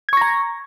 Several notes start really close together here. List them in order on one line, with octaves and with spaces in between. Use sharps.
G#6 C#6 A#6 A#5